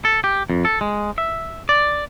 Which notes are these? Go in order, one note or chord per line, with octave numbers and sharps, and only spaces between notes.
A4
G4
F2
A4
G#3
E5
D5